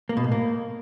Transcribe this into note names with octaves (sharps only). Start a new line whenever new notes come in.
A#3
B2
A2
A#3